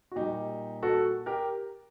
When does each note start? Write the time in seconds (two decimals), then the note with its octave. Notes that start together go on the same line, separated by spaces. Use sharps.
0.11 F#4
0.16 A#2 G3 D#4 G4
0.83 F#4 A4
1.26 G4 A#4